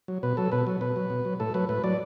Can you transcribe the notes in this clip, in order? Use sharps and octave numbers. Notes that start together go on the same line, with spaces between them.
F#3
B2 B4
F#3 A4
B2 B4
F#3
B2 B4
F#3
B2
F#3
A2 A4
F#3 B4
A2 B4
F#3 D5